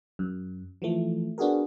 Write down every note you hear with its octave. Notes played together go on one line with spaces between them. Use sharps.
F#2
E3 F3 A3
B3 D4 F#4 G#4 A#4